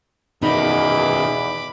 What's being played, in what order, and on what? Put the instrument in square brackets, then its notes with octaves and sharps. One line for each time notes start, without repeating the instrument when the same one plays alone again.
[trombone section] E2 [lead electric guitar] B2 D#3 [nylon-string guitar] D#4 D#5 [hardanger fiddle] B5 D6